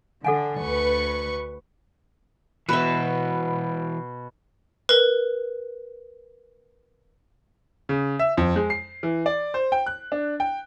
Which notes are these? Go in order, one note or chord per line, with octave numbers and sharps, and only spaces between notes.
D3 A4 F#5 G#5
D2 B4 C#6
B2 E3 F#4 B4 E5
A#4 B4
C#3
E5
F2
G#3
C7
E3
D5
C5
G5
F#6
D4
G5